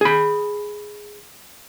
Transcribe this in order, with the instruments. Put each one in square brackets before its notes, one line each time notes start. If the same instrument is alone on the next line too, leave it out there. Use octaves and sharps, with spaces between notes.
[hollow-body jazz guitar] G#4 B5